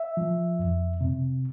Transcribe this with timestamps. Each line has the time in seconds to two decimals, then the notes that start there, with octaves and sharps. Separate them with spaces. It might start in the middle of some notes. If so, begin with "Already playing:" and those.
Already playing: E5
0.17 F3
0.59 F2
1.01 C3